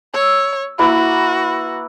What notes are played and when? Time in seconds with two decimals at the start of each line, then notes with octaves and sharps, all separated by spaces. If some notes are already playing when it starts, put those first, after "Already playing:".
0.14 C#5 E6
0.79 A#3 E4 F#4 B4